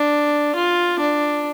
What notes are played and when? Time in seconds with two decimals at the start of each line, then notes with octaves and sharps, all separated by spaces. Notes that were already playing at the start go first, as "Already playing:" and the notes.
Already playing: D4
0.55 F4
0.99 D4